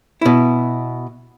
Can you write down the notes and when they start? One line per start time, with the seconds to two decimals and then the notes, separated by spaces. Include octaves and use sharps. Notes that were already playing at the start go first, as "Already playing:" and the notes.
0.21 B2 E4